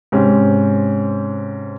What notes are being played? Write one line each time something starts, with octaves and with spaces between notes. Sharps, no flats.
G#2 C3 C4 C#4